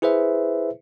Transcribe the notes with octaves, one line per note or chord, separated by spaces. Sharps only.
E4 G#4 B4 C5 E5